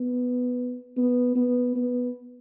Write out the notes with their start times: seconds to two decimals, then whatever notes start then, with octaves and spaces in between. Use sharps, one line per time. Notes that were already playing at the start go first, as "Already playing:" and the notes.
Already playing: B3
0.97 B3
1.36 B3
1.75 B3